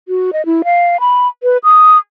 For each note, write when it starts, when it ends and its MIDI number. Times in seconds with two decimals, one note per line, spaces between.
0.08 0.31 66
0.33 0.45 75
0.46 0.62 64
0.64 0.97 77
1.00 1.27 83
1.43 1.58 71
1.64 1.98 87